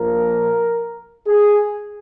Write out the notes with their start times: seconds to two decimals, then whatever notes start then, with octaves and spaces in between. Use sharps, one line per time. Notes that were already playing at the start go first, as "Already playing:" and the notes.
Already playing: A#1 A#2 F3 A#4
1.26 G#4